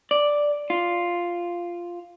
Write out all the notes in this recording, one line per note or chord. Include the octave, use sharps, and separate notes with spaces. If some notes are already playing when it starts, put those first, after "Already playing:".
D5
F4